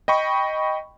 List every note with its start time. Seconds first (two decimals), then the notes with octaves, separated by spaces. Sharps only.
0.08 D#5 G5 B5 C#6